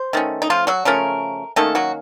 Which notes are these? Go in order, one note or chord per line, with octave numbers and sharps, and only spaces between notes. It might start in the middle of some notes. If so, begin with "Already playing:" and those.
Already playing: C5
D#3 A3 C#4
D#4
F3 F4
F#3 F#4
C#3 F3 A3 C#4 A#4
D#3 A3 A#3 C#4 A4
F#3 F#4